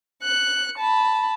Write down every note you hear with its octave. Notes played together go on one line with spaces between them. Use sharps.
F#6 C#7
A5 B5